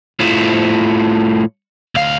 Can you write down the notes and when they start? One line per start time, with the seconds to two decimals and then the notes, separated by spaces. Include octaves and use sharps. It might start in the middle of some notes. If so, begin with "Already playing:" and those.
0.20 A2 F3
1.95 D2 F5